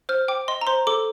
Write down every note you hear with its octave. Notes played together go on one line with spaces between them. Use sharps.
C5 F6
G5 D6
D#5 C6
A#5
C5 C6
A4 D6